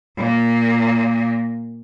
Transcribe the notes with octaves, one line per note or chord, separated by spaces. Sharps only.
A#2 A#3